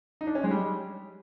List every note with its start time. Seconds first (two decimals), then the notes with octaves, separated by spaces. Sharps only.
0.21 D#4
0.27 D4
0.35 C#4
0.44 G#3
0.51 G3